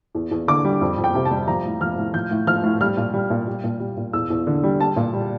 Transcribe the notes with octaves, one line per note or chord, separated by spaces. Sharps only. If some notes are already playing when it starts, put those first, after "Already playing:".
E2
E2
D3 D6
G3
F2
F2
G5
C3
A5
G3
F3 A#5
A2
F3 F6
A2
F3 G6
A2
F3 F6
A2
G3 F6
A#2
G3
A#2
G3
A#2
G3
A#2
E2 E6
E2
D3
G3
G3 A5
A#2
G3